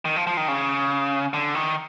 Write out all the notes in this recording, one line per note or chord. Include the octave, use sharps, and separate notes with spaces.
D#3
F3
F3
D#3
C#3
D3
D#3